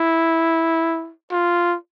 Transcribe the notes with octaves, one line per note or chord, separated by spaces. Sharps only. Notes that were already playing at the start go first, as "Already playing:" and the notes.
Already playing: E4
F4